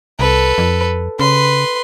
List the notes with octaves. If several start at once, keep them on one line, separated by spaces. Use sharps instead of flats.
C2 A4 B4
F2
C#3 B4 C6